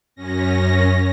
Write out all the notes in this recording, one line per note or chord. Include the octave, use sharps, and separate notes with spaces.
F#2 C#4 A#6